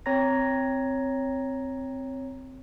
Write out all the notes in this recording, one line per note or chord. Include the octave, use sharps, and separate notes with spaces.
C4 C#5 A#5 A#6